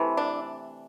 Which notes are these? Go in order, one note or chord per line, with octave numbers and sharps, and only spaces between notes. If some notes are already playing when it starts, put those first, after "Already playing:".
Already playing: C3 E3 A3
D4